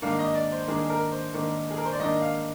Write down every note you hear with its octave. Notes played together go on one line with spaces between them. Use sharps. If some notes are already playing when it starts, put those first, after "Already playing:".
G#2 D#3 A#3 D4 F5
D#5
D5
C5
G#2 D#3 A#3 D4 G#4
A#4
C5
G#2 D#3 A#3 D4
G#4
A#4
C5
D5
G#2 D#3 A#3 D4 D#5
F5